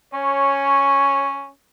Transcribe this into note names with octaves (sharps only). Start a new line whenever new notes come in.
C#4 C#5